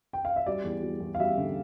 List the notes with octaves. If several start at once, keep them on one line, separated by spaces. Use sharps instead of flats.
G5
F5
E5
G3 D5
E2
G3
E2
F5
G3 E5
D3